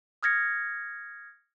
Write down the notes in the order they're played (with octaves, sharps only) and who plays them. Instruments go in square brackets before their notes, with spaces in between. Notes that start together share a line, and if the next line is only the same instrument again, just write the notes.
[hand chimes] D#6 F6 G#6 A#6 C#7